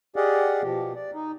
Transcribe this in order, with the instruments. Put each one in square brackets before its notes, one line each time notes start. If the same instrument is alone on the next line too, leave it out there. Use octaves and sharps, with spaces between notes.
[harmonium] G4 G#4 D5 D#5 F5 F#5
B2 F3 G4
D5
D#4